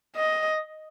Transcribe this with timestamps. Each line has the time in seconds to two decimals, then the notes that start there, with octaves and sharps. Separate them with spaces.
0.16 D#5